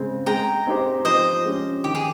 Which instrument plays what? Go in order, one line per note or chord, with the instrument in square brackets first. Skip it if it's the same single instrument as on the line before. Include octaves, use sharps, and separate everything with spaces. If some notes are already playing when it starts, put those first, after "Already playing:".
Already playing: [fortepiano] C#3 G#3 C4
[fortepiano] G#3 [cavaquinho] G5 A#5
[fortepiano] C4 D#4 G4 C5
[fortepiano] F3 [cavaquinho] C5 D#5
[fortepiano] G#3 C#4 G4
[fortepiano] D#3 [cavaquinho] G4
[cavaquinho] G#4